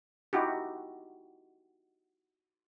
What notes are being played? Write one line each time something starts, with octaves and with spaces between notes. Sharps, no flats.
D#4 E4 F#4 G4